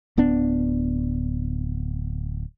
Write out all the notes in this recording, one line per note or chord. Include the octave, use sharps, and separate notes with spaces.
D1 B3 D4